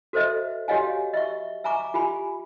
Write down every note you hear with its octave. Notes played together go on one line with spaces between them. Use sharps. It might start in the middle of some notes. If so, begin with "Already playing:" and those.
F#4 A4 B4 C5 D#5 E5
F#4 G4 C#5 D#5 F5 G#5
D#5 E5 C#6
E5 G#5 A#5 C#6 D6
F4 G4 G#5 B5